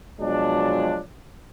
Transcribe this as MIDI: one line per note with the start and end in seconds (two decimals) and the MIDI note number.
0.20 0.99 47
0.20 0.99 53
0.20 0.99 54
0.20 0.99 56
0.20 0.99 62